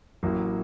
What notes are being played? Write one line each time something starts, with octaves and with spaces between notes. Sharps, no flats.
A1 A2 F#3 A#3